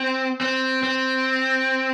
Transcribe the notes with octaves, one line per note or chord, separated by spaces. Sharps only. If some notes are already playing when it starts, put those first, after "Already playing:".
Already playing: C4
C4
C4